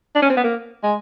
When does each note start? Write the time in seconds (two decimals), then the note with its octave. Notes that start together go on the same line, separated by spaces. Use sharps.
0.15 D4
0.22 C#4
0.30 C4
0.37 B3
0.44 A#3
0.83 G#3